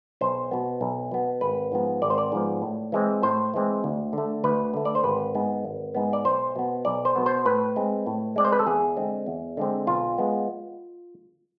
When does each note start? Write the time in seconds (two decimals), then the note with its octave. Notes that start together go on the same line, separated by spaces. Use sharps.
0.21 B1 C5
0.51 B2 B3
0.81 B1
1.11 B2 B3
1.41 G#1 B4
1.72 G#2 F3 B3
2.02 G#1 D5
2.10 C5
2.18 D5
2.32 G#2 F3 B3
2.62 A2
2.92 E3 G#3 C4
3.22 A2 C5
3.54 E3 G#3 C4
3.84 D2
4.13 D3 A3
4.44 D2 B4
4.74 D3 A3
4.85 D5
4.95 C5
5.04 G#1 B4
5.35 G#2 G#3 B3
5.65 G#1
5.95 G#2 G#3 B3
6.13 D5
6.25 B1 C5
6.56 B2 B3
6.85 B1 D5
7.05 C5
7.16 B2 B3
7.26 C5
7.45 A2 B4
7.76 G#3 C4
8.06 A2
8.36 G#3 C4 D5
8.45 C5
8.52 B4
8.59 A4
8.67 E2 G#4
8.97 D3 G#3 C4
9.27 E2
9.57 D3 G#3 C4
9.87 B1 F4
10.18 G#3 B3